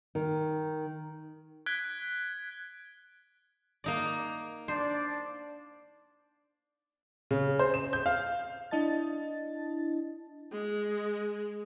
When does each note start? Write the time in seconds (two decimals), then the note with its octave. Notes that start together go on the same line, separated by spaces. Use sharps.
0.15 D#3
1.66 F#6 G#6 B6 D7 G7
3.84 A#3 D#4 D5
4.68 D4 C5 D5
7.31 C#3
7.59 C5
7.74 E7
7.93 G6
8.06 F5
8.71 D4 E4 D#5 A5 A6
10.52 G#3